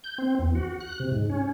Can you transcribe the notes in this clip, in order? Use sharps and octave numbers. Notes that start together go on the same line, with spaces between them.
G6
C4
E2
F#4
F#6
C3
G#2
C#4